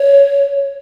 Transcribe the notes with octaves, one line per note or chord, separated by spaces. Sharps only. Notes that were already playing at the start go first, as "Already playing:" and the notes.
Already playing: C#5